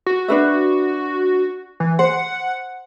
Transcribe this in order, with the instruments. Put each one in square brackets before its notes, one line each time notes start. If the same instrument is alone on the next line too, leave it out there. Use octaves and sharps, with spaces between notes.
[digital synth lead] F#4
[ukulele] D4 B4 E5
[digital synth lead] E3
[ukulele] C5 [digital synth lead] F#5